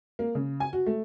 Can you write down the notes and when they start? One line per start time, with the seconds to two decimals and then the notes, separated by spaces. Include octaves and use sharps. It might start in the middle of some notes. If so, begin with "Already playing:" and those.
0.19 A#3
0.35 C#3
0.60 G#5
0.73 F#4
0.86 A3